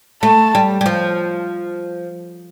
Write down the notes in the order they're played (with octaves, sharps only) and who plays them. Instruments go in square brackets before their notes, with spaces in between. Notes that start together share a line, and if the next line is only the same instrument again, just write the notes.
[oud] A3 [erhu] A5
[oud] G3
G3
F3